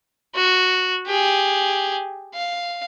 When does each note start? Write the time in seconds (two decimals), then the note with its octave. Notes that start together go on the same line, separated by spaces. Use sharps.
0.35 F#4
1.07 G4 G#4
2.34 F5